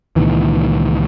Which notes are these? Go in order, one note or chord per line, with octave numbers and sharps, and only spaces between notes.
C#2 A#2 D#3 E3